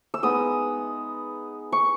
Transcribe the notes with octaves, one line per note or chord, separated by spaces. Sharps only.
E6
G#3 B3 D#4 D#6
C#6